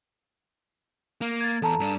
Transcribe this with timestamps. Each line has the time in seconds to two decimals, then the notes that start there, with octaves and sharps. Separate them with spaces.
1.21 A#3
1.41 G#6 A6
1.62 E2 A4 A5 A#5
1.80 G2 D4